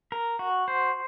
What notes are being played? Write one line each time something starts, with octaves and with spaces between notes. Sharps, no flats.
A#4
F#4
C5